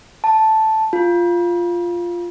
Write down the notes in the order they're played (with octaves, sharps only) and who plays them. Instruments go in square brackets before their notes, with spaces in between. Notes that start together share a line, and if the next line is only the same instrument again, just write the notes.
[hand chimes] A5
F4